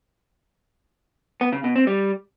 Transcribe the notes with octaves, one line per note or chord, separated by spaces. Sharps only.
B3
C#3
B2
C4
G3